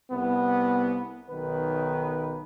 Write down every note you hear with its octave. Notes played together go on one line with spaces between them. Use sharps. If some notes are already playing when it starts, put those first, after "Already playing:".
C2 B3
B1 D#3 B4